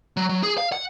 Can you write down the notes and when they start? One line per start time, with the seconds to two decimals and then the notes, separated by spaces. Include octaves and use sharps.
0.17 F#3
0.29 F#3
0.43 G#4
0.58 F5
0.72 F#5